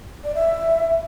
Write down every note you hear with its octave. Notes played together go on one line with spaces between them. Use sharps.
D5
E5